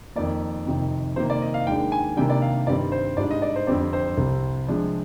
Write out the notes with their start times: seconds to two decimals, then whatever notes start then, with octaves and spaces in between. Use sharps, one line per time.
0.16 F2 D#3 A#3 D5
0.67 F2 C3 D#3
1.16 C3 D#3 A#3 C5
1.30 D5
1.42 D#5
1.54 F5
1.66 D#2 D#3 G#3 D4 G5
1.92 G#5
2.17 C3 D#3 G3 A#3 D4 G5
2.30 D5
2.42 F5
2.67 G2 D#3 G3 C4 D5
2.92 C5
3.17 G#2 G3 D4 D5
3.31 D#5
3.42 D5
3.56 C5
3.67 F2 D3 G3 C4 D5
3.93 C5
4.17 C2 C3 G3
4.68 C3 F3 G#3 D4